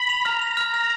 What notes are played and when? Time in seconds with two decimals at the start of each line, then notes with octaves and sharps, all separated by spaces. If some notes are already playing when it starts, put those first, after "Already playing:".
Already playing: B5
0.09 F7
0.25 A#5 F6
0.42 F7
0.57 F6
0.74 F6